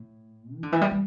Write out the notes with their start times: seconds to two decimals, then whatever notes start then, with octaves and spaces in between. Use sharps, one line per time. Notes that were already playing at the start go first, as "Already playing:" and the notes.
Already playing: A2
0.55 E3
0.63 D3
0.72 E3
0.81 G3
0.91 G3